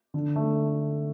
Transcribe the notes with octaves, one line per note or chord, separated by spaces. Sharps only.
D3
A3